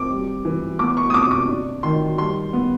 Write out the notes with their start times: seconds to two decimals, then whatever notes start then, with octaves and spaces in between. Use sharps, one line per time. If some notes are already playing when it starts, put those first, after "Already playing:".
Already playing: C4 D6
0.10 G3
0.45 E3
0.79 B3 D6
0.97 C#6
1.10 D#6
1.14 C3 D6
1.31 D6
1.48 D4
1.83 D#3 C6
2.18 G3 C6
2.53 B3